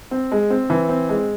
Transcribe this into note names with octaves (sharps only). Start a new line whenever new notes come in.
C4
G#3
C4
E3
C4
G#3